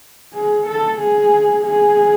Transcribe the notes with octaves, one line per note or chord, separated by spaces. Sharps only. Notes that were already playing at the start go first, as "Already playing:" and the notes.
G#4
A4
G#4
G#4